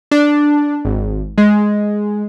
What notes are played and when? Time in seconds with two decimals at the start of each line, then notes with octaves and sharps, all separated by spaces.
0.11 D4
0.85 G#1
1.38 G#3